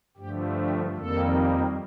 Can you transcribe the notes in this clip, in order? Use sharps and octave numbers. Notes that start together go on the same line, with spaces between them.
G2 D3 F3 A3 G4
G4
F2 D#3 G3 A#3 A4